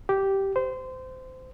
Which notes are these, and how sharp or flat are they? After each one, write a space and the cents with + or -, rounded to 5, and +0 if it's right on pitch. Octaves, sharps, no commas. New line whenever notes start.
G4 -10
C5 -25